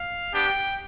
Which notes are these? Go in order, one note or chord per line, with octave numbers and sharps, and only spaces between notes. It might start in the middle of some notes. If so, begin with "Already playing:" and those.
Already playing: F5
B3 D4 G4 G5